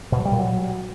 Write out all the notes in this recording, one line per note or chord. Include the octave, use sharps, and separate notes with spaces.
B2
F#3
G3
A#2
F#3